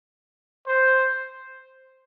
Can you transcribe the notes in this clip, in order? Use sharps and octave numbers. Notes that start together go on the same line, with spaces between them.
C5